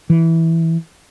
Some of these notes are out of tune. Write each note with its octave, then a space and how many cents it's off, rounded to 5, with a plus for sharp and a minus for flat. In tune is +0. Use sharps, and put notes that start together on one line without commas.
E3 -5